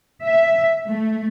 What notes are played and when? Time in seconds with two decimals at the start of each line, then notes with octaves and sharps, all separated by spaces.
0.24 E5
0.87 A3